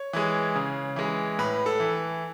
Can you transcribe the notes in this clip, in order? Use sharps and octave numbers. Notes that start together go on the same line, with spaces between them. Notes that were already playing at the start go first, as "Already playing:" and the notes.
Already playing: C#5
E3 G#3
C#3
E3 G#3
A2 B4
A4
E3